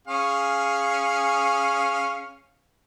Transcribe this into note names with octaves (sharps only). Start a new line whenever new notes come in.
C#4 G#4 F5